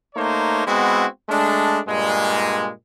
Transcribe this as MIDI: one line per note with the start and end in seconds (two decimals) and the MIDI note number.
0.15 0.66 57
0.15 0.66 58
0.15 0.66 63
0.15 0.66 72
0.15 0.66 73
0.67 1.06 56
0.67 1.06 59
0.67 1.06 60
0.67 1.06 64
0.67 1.06 66
1.29 1.79 56
1.29 1.79 57
1.29 1.79 62
1.88 2.70 43
1.88 2.70 46
1.88 2.70 56